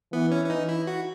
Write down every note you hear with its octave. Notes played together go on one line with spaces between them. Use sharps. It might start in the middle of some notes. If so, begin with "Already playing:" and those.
E3 B3
C#4
C#4
D#4
E4
F#4